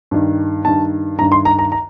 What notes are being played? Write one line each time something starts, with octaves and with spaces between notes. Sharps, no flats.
G2 D#3
G2 D#3 A5
G2 D#3 A#5
C6
A#5
A#5
A#5